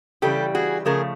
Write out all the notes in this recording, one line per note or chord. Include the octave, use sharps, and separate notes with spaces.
C#3 E3 G3 G4 A4
F#4 G#4
C#3 F3 A3 G#4 A#4